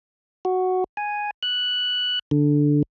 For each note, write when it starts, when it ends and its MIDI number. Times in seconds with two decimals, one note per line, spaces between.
0.45 0.84 66
0.97 1.31 80
1.43 2.19 90
2.31 2.83 50